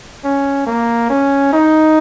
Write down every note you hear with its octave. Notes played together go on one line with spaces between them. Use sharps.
C#4
A#3
C#4
D#4